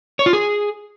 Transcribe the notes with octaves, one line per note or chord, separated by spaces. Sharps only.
C#5
F4
G#4